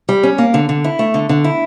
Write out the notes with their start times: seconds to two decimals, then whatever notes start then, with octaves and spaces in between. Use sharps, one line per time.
0.09 G3
0.23 C#4
0.38 A#3
0.54 D3
0.69 D3
0.84 E4
0.99 A3
1.14 D3
1.29 D3
1.44 E4